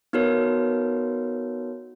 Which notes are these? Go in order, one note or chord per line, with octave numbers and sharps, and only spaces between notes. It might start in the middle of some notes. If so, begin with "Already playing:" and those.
B3 D#4 F#4 A#4 B4 C#5